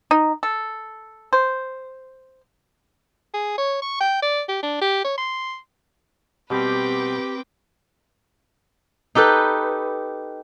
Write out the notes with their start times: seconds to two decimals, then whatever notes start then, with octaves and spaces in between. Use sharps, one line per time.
0.11 D#4
0.43 A4
1.33 C5
3.34 G#4
3.58 C#5
3.82 C#6
4.00 G5
4.22 D5
4.48 G4
4.62 D4
4.81 G4
5.04 C#5
5.17 C6
6.50 B2 G3 C4 G4 B4 G5 D6
9.15 D#4 G4 A4 B4